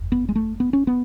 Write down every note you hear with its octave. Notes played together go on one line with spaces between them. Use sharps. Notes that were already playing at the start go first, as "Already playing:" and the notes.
Already playing: F#1 E2
B3
G#3
A3
B3
C#4
B3